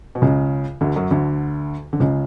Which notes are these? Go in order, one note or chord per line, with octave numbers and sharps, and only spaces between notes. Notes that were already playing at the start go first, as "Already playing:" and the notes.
B2
C#2 C#3
D2 D3
F#2 F#3
D2 D3
D3
C#2 C#3